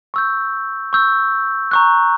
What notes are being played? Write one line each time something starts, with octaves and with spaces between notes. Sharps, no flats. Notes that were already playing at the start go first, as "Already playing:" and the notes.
C#6 E6 G6
C#6 E6 G6
A#5 C#6 F#6